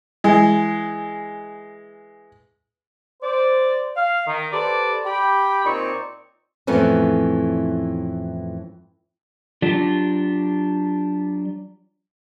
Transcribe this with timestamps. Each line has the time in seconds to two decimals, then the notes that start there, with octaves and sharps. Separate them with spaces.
0.24 E3 G#3
3.22 C5 D5
3.96 F5
4.27 D#3
4.52 G4 A4 B4 C5 D5
5.05 G4 G5 B5
5.65 A#2 C4 D#4 C#5 D5 C#6
6.67 F2 A2 E3 B3 C#4
9.62 F#3 D4 F4 G4